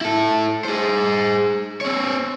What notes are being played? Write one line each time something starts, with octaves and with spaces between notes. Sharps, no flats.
E4 A4
G#4 C5
C4 C#5